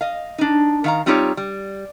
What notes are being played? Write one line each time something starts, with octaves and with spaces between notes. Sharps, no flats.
D#5 F5
D4 D#4
D#3 F5 A#5
G3 C4 D#4 F4 G4 C#5
G3